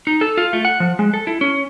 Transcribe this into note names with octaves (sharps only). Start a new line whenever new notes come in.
D#4
A4
F4
A3
F#5
F3
G#3
A4
E4
C#4